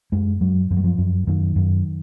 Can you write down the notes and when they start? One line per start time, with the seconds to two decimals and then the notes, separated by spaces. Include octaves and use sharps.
0.12 F#2 G#3
0.41 F#2 F#3
0.71 F#2 F3
0.77 F#3
0.84 F3
0.98 F#2
1.27 F#2 D#3
1.56 F#2